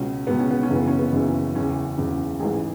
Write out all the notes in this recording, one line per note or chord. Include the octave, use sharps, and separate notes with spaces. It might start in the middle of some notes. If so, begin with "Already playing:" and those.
Already playing: C#2 B2 C#4
C#2 B2 B3
C#4
B3
C#4
F#1 F#2 C#3 E3
B3
C#4
B3
F#1 F#2 C#3 E3
F#1 E2 C#3 C#4
F#1 E2 C#3
A1 G#2 E3 G#4